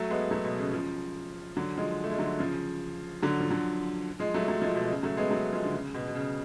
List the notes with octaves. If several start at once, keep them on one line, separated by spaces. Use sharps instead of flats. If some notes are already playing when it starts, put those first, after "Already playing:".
Already playing: F#3 A3
G#3 B3
F#3 A3
B2
C#3
C#3 F3
D3 F#3
F3 G#3
A3
G#3
D3 F#3
C#3 F3
D3 F#3
F3
D3 F#3
F3 G#3
F#3 A3
F#3 A3
F3 G#3
B2
C#3
F#3 A3
G#3 B3
F#3 A3
F3 G#3
D3
C#3
B2
B2
C#3